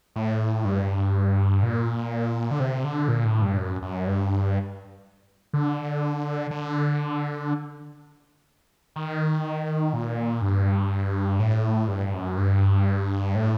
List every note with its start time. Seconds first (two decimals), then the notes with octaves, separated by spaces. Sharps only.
0.16 A2
0.65 G2
1.63 A#2
2.51 D3
2.60 C3
2.84 D3
3.08 A#2
3.25 A2
3.42 G2
3.57 F#2
3.82 F#2
4.07 G2
5.53 D3
6.51 D3
8.96 D#3
9.93 A#2
10.42 G2
11.40 A2
11.88 G2
12.14 F#2
12.37 G2
13.35 A2